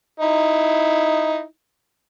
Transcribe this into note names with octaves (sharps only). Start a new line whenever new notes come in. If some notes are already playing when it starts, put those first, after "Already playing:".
D#4 E4